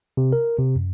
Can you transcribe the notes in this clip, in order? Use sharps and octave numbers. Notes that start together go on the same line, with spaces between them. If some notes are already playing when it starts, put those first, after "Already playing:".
C3
A#4
C3
F#2